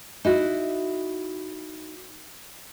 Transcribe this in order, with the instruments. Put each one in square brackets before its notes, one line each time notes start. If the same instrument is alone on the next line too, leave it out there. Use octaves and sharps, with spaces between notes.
[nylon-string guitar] D#4 E4 F#4